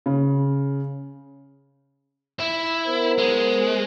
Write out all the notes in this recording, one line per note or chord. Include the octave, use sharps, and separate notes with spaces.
C#3
E4
B3 A#4 C5
G#3